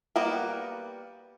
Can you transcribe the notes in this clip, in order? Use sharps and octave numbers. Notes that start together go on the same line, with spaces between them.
G3 A#3 B3 F#4 A#4